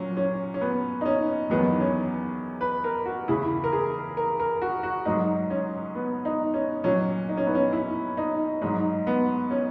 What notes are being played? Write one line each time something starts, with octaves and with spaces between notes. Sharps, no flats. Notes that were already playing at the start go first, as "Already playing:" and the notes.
Already playing: A#2 F#3 C#4
C#4
C#4
B3
D#4
C#4
E2 D#3 F#3 B3
C#4
B4
A#4
F#4
E2 C#3 E3 E4
A#4
G#4
A#4
A#4
F#4
F#4
G#2 F#3 D#4
C#4
B3
D#4
C#4
A#2 F#3 C#4
D#4
C#4
B3
C#4
E4
D#4
G#2 F#3 D#4
B3
C#4